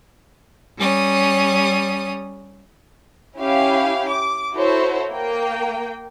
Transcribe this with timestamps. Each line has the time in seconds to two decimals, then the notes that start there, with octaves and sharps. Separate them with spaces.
0.78 G3 C#4 D#6
3.38 C#4 E4 G4 F5
4.09 D6
4.54 E4 F#4 A4 C5 C#5
5.10 A#3 G5